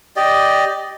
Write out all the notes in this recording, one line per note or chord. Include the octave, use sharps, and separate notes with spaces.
G4 D5 D#5